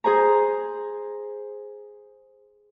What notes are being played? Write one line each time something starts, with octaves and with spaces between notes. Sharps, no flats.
G#4 C5 G#5 A#5